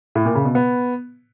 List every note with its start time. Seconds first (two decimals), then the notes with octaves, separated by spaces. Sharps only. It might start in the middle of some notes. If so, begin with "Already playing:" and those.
0.15 A2
0.25 A#2
0.35 C#3
0.45 B2
0.55 B3